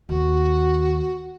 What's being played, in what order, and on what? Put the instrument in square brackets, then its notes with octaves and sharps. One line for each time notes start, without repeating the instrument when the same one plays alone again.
[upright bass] D#2 [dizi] F#4